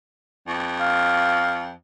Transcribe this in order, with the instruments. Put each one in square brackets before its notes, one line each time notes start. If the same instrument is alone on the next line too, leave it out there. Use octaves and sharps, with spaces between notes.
[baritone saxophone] F2
[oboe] F5